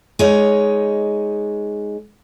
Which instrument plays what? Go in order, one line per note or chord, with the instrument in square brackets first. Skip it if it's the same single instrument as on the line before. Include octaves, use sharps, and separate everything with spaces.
[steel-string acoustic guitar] G#3 D#4 C#5